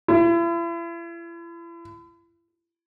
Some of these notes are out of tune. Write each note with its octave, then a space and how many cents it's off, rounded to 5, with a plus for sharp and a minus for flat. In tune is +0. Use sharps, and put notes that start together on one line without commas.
E4 +40